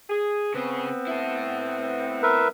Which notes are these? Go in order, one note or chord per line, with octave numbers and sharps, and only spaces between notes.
G#4
C#3 B3 C4 G#4
E4 A4
A#4 B4 E5